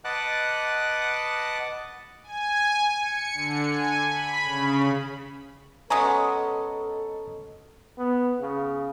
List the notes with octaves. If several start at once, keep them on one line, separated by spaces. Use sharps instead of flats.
B4 D#5 F#5 A5 D6 F#6
G#5
C#7
D3
G#5
B5
C#3
B2 G#3 C#4 A4 A#5 D#6
B3
C#3